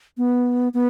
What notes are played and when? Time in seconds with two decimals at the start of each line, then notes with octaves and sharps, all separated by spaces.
0.18 B3
0.74 B3